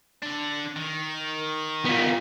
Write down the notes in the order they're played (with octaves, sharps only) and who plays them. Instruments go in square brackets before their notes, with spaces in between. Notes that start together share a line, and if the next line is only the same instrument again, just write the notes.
[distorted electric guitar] D3 D4
D#3
[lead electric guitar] B3 F4